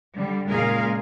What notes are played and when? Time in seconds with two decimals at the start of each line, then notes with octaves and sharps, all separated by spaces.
0.14 D3 G3
0.48 A#2 C#3 G#3 G#4 A#4 F5